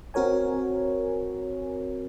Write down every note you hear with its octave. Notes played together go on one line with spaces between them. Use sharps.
C4 F#4 A#4 C#5 G#5